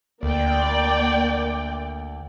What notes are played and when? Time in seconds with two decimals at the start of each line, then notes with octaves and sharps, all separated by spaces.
0.23 D2 A#3 D5 G5